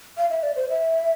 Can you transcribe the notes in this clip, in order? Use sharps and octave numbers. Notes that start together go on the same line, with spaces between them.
F5
E5
D5
C5
E5